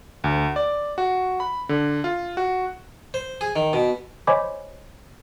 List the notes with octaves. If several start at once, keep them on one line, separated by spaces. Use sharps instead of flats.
D2
D5
F#4
B5
D3
F4
F#4
C5
G#4
D#3
B2
C5 C#5 D#5 G#5 B5 D6